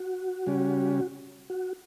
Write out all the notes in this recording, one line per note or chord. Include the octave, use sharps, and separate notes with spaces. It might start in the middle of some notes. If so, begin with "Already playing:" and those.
Already playing: F#4
C#3 G3 C#4
F#4